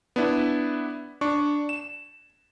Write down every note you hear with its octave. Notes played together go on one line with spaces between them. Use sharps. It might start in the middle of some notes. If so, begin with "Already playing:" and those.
B3 D4 E4
D4 C#6
E7